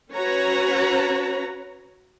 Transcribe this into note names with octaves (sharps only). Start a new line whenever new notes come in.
C#4 F#4 B4 C#5 A#5